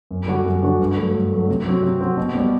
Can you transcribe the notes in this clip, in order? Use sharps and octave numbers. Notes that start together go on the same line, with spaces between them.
F#2
D3 G3 D4 F#4
F#2
D3 G3 D4 F#4
G2
F#3 A3
G2
F#3 A3
C3
F#3 C4 F#4
C3
F#3 C4 F#4
B2
G3 B3